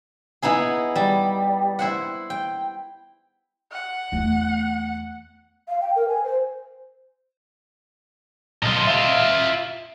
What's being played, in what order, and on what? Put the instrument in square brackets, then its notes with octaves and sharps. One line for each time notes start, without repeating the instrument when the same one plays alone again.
[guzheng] B3 D#4 E4 G#4
G3
E4 C5 F#5
G5
[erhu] F#5
[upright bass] E2 A3
[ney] F5
G5
A#4
G#5
C5
[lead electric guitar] B1 C6 [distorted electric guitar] F4 D#5
[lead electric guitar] E5 C6